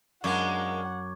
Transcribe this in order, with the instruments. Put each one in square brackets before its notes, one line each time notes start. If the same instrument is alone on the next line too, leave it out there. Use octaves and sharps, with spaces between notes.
[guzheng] F#2 [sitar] G#3 A#3 D4 [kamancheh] F#5 [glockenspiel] C#6 D6 G#6